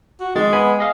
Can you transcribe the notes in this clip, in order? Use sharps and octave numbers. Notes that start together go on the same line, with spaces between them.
F#4
F2 D#3 G#3 A6
B3 G#5 B5
G#4 D#5 F5